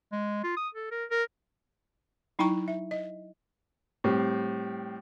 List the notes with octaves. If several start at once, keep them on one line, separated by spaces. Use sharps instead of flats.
G#3
F4
D#6
A4
A#4
A#4
F#3 D#4 E4 G5 A#5 C#6
E5
D#5
A2 G3 C4